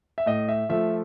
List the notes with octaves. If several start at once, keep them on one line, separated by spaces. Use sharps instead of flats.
E5
A2 D#5
E5
F3 A3 E5